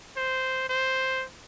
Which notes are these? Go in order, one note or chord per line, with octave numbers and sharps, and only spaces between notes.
C5
C5